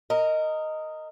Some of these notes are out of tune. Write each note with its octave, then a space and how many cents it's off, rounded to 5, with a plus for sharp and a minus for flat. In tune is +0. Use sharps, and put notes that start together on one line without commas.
A#4 -15 D#5 +0